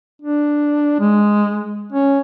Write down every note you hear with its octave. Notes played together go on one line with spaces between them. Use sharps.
D4
G#3
C#4